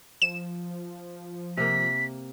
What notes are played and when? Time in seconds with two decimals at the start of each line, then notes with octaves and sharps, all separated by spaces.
0.22 F3 E7
1.57 C3 A#3 B6